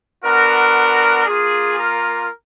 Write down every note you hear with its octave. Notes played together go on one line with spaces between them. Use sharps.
B3 D4 F#4 A#4
A#3 F4 G#4
A#4